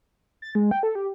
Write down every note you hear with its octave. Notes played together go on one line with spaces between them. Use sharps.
A6
G#3
G5
A4
G4